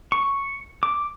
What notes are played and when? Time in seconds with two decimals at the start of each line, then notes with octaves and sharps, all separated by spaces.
0.12 C#6
0.83 D6